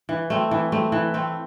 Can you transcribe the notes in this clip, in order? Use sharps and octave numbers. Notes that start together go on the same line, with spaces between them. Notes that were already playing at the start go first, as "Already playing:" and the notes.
E3
A3 C4
E3
A3 C4
E3
A3 C4